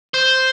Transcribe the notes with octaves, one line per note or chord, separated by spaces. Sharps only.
C5